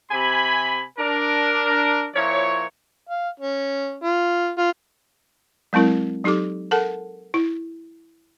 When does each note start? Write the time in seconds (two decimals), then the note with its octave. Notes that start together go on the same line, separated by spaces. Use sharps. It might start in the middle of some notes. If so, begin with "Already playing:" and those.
0.11 C3 G#5 B5
0.98 D4 A#4
2.15 A#2 F3 E4 C#5
3.09 F5
3.40 C#4
4.04 F4
4.58 F4
5.73 F#3 G#3 C4 E4 A#4
6.24 F#3 D#4 G4 A4 D6
6.71 A4 A#4 F#5 A5
7.34 E4